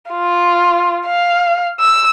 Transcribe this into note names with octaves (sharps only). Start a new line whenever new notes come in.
F4
F5
E6